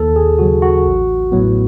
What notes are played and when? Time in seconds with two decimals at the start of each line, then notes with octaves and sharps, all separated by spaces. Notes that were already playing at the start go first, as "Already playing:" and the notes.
Already playing: D#2 A4
0.16 G#4
0.39 C#3 F#3 F#4
0.62 F#4
0.86 A1
1.32 A2 F#3 B3